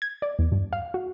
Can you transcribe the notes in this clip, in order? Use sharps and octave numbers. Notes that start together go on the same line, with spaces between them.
G#6
D5
E2
G2
F5
F#4